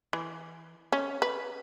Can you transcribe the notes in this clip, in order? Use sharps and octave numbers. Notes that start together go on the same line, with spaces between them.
E3
C#4
B4